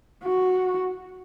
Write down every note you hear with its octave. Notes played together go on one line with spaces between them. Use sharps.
F#4